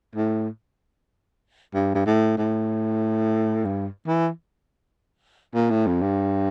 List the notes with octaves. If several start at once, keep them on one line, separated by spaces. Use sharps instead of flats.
A2
G2
G2
A2
A2
G2
E3
A#2
A2
F2
G2